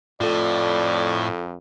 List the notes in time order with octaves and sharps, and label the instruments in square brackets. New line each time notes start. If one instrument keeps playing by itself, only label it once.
[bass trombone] F2 [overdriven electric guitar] A2 [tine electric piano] F4 A4 [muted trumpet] D5